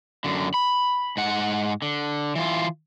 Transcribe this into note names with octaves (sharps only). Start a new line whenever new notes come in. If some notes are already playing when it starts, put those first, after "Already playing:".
F#2 D3
B5
G#2 F#5
D3
E3 F4